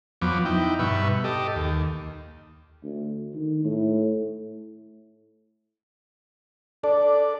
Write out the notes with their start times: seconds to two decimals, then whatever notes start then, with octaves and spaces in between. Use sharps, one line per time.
0.22 F2 F3 F#3 B3 D6
0.45 D#4 E4 G5
0.79 G2 B2 B4 E5 C#6
1.24 G4 A4 D#5
1.55 D#2
2.83 D2
3.34 D#3
3.64 A2
6.84 D4 A4 D5